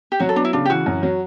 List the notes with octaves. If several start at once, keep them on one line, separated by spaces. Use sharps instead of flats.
G4
F#3 F#4
A4
B3 D4
E4
C#3 D4
G4
E3 F#4
F#2
F#3